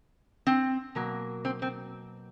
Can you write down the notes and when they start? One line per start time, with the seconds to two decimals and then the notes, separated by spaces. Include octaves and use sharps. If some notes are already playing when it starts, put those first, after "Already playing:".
0.47 C4
0.95 B2 F#3 A#3
1.45 C4
1.62 C4